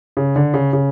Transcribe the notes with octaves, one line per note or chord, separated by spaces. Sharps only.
C#3
D3
C#3
C#3